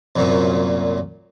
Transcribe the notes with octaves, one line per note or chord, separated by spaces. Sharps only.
C2 F#2 A#2